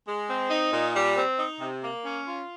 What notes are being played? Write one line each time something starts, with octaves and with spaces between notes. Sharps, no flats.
G#3
C4
D#4
A#2
G3
C4
D#4
C3
A#3
C#4
F4